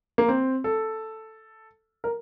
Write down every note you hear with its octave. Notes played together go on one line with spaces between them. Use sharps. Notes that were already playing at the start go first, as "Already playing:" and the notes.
A#3
C4
A4
A#4